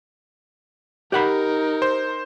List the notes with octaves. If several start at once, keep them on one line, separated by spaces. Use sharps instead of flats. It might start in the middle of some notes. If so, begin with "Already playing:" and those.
D#4 G4 A#4 F#5 B5
C5